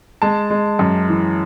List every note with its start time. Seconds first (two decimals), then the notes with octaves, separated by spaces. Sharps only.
0.22 G#3 A5
0.50 G#3
0.79 F#2
1.09 E3